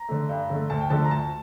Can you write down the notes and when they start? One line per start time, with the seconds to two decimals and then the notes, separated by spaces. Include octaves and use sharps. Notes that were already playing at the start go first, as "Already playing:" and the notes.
Already playing: A#5
0.09 D3 A3
0.29 G2
0.50 D3 A3
0.70 D2 A5
0.80 G5
0.90 D3 F3 A3 A5
1.04 A#5
1.11 D2 A5